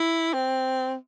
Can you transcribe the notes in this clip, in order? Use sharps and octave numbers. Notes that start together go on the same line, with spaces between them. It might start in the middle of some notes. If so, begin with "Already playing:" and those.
Already playing: E4
C4